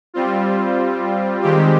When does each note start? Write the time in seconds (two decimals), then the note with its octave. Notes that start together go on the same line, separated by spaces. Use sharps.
0.14 G3 C4 F4
1.42 D#3 G#3 C4 G4